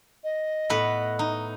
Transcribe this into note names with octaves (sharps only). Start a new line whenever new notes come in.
D#5
A2 B3 B4
D#4